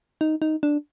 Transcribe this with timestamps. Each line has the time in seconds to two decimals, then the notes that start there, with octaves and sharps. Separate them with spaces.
0.21 D#4
0.42 D#4
0.63 D4